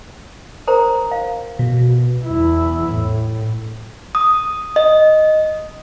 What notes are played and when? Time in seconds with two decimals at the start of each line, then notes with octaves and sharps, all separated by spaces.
0.68 A#4 C5 A#5
1.12 F5
1.59 B2
2.25 E2 E4
2.91 A2
4.15 D#6
4.76 D#5